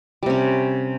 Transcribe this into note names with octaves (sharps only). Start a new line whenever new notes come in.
C3 G3 C#4